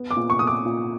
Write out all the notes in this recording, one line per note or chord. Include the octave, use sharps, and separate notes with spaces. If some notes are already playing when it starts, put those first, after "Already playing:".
Already playing: B3
D6
A#2
C#6
A#2 D#6
D6
A#2